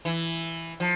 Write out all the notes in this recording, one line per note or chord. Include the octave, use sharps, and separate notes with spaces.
E3
F3